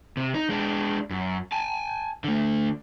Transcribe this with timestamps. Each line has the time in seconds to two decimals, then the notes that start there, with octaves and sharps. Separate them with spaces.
0.17 C3
0.34 D#4
0.50 G#3 D4
1.10 F#2
1.52 G#5 A5
2.24 D3 A3